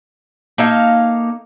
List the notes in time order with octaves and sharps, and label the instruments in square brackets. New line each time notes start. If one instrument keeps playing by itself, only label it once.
[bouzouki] A#3 D#4 A4 F5